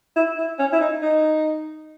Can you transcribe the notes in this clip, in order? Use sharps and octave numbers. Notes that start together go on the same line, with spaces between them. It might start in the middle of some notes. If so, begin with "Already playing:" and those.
E4
E4
C#4
E4
D#4
D#4